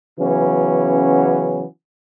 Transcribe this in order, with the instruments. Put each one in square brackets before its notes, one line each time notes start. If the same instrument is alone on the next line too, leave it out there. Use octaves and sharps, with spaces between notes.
[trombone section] C#3 E3 F#3 B3 C#4